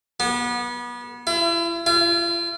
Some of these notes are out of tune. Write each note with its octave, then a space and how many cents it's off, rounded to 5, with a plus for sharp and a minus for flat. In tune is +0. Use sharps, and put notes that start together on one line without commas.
B3 -30
E4 +40
F4 -40